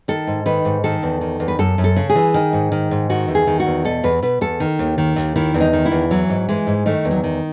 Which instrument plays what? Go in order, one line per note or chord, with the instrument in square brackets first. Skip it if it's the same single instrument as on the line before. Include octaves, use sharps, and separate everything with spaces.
[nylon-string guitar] D#3 A4
G#2
D#3 B4
G#2
D#3 A4
E2
D#3
E2
B4
F#2 A4
F#2
A4
C#3
G#4
E3
D#3
G#2
D#3
G#2
D#3 F#4
E2
G#4
D#3
F#4
E2
B2 A4
E2 B4
B2 B4
E2 A4
D#3
D#2
D#3
D#2
D#3 E4
E2
D#4
D#3
E4
E2
E3 F#3
G#2
E3 G#3
G#2
D#3 A3
E2
F#3
D#3